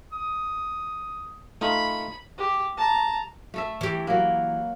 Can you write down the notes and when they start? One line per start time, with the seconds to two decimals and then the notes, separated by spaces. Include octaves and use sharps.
0.12 D#6
1.61 A3 D#4 F4 B5
2.38 G4
2.77 A5 A#5
3.54 A3 A4 E5
3.81 E3 G4
4.07 F#3 A#3